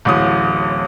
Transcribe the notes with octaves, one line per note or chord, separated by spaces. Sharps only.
D1 A1 D#6